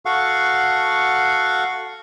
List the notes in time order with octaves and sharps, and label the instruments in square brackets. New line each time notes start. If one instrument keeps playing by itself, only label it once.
[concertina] F#4 A4 F5 F#5 C#6